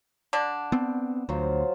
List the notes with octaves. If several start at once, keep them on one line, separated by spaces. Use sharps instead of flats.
D3 D4
B3 C4
D2 F#3 F4 C5